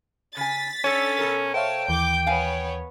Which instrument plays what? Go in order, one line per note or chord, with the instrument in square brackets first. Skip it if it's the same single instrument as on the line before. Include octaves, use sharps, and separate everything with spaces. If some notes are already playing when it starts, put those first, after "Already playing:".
[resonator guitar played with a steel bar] C#3 G#5 [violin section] A6 B6
[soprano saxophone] C#4 [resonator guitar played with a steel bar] D4 A4 C#5
[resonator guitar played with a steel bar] B2 A4 A#4
[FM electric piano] C5 E5 F5 [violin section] C#5 A5 [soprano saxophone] G5
[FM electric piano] D#2 E3 [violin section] D6 G6
[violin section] B3 C#5 [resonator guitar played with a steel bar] F5 G#5